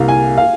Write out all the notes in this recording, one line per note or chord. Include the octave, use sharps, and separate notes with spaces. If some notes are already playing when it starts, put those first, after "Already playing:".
Already playing: C2 A#3 F5
G#5
F5